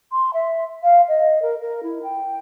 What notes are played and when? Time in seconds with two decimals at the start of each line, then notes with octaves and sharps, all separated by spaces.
0.12 C6
0.34 E5
0.83 F5
1.08 D#5
1.42 A#4
1.61 A#4
1.83 E4
2.03 G5